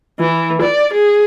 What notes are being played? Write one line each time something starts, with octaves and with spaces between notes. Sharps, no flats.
E3
D5
G#4